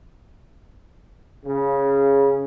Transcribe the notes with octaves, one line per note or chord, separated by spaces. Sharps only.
C#3